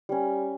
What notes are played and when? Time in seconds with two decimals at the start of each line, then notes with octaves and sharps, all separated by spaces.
0.09 G3 C#4